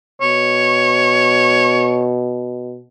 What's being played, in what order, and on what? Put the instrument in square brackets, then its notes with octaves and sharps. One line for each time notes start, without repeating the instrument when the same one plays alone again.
[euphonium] B2 [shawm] C#5